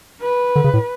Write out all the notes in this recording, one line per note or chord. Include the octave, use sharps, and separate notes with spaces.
B4
D3
C#3
A2